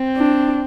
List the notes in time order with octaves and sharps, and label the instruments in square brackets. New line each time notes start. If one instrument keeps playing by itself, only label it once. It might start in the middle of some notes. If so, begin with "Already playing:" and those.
Already playing: [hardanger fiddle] C4
[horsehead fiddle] D4